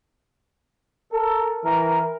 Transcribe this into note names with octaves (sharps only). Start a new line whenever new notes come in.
A4 A#4
E3 A#4